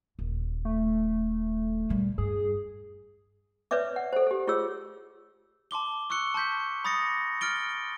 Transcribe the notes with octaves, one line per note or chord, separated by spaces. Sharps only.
D#1
A3
A#2 G3
G2 G#4
B4 C#5 D5 E5 D6
F#5
A4 C5
G4 A4
F4 G#4 C#5 E6
A5 C6 D6 G7
C#6 E6 F#6 C#7 G7
A5 C6 G6 B6
B5 D#6 A6 A#6 C#7
F6 A6 D7 G7